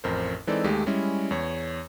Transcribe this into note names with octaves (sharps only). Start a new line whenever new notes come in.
A1 F2 A#4 C5
E3 G#3 C4 D#4 A4 D5
D#2 G#3 A3 G4
G3 G#3 C#4 E4
E2 C#5